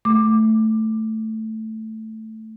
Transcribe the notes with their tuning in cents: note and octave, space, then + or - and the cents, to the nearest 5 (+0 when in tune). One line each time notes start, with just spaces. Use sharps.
A3 +0 D6 +10